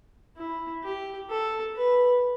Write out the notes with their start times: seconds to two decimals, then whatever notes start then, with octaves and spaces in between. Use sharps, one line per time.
0.37 E4
0.83 G4
1.29 A4
1.75 B4